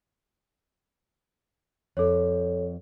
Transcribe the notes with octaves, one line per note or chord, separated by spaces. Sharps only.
F2 A4 C#5